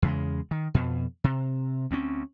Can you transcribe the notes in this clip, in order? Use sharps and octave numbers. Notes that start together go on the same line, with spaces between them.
E2 C#3 G#3
D#3
F2 B2
C3
D2 C4 C#4